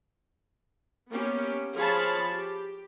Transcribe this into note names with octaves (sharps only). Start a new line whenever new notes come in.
A#3 B3 C#4 G4
F3 G#4 C#5 F5 A5 B5
G4